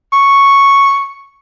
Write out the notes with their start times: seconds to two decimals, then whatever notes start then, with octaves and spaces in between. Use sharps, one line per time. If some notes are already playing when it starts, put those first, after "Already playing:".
0.13 C#6